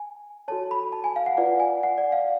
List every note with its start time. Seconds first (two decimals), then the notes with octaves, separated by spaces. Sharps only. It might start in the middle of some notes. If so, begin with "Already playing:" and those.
Already playing: G#5
0.48 F#4 A4 C#5 A5
0.71 B5
0.92 A5
1.04 G#5
1.16 F5
1.26 F#5
1.37 F4 B4 D5 F#5
1.60 G#5
1.83 F#5
1.98 D5
2.12 F5